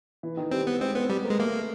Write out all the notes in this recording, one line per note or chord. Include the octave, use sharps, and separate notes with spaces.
E3
D#3
G3 C4
B3
G#3 C4
B3 C4
G3 B3
A#3
G#3
A3 A#3